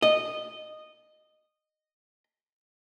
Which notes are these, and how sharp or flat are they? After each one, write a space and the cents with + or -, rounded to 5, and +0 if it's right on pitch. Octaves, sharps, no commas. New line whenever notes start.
D#5 -15